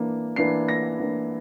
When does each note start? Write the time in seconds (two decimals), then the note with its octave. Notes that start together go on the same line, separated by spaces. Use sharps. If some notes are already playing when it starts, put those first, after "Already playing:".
Already playing: E3 A#3 D4
0.36 E3 A#3 D4 C7
0.68 A#6
1.00 E3 A#3 D4